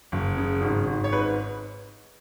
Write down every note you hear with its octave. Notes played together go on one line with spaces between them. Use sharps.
F#1
C#3
G#1
G#1
C#5
G#2 B4